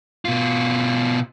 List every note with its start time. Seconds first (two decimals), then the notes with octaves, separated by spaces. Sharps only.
0.25 B2 F4